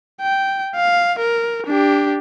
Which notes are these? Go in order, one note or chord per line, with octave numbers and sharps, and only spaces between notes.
G5
F5
A#4
D4 G4